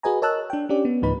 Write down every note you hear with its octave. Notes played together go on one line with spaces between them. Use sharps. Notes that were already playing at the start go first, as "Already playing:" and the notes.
F#4 G#4 B4 D#5 G#5 A#5
A#4 C#5 D#5 A5 E6 F#6
D4 G5
C#4 D4 G4 D5
B3
D2 A2 F3 D#4 B4 B5